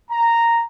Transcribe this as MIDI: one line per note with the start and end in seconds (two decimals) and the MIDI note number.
0.11 0.64 82